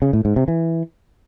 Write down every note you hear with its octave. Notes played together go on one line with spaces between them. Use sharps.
C#3
A2
G#2
C3
E3